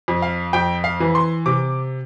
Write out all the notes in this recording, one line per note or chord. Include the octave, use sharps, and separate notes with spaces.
F2
F5
F2 G5
F5
E3
C6
C3 D6